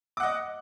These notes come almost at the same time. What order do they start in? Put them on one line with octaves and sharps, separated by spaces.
D6 F#5 D#5